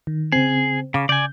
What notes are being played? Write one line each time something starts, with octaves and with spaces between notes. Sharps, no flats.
D#3
C#3 C4 G#4
C#3 F5 D6
C#3 D5 G#5 G6